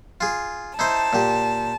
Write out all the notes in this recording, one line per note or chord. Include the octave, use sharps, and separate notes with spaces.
F4 G#4
D#4 E4 C5 A5
A#2 G4